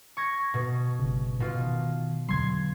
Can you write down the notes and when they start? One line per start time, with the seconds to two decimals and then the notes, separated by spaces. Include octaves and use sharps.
0.17 C#6 G#6 A#6
0.54 B2
0.99 G1 C#3
1.40 B2 F4
1.61 D#3
2.29 E2 D3 F#3 C6 G#6